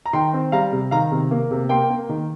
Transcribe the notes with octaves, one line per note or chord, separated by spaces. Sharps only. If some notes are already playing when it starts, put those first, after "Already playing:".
A#5
D#3 G5 C6
C4
G3 F5 A#5
C3
D#3 F5 A#5
C3
A#3
C3
A#3 G5 C6
A#3
D#3